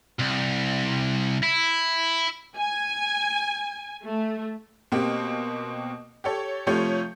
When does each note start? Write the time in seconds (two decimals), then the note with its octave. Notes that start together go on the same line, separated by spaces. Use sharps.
0.20 C2
1.43 E4
2.57 G#5
4.05 A3
4.92 B2 A#3 C4 G4
6.24 G4 A4 C#5
6.67 C3 F3 A3 C#5 G6